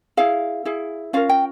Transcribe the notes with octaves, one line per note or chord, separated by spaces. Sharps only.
E4 G#4 F5
E4 G#4
C#4 F4 A#4 F5
G5